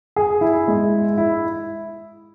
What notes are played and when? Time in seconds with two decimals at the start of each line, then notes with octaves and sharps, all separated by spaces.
0.16 G#4
0.41 E4
0.68 G#2 G#3
1.18 E4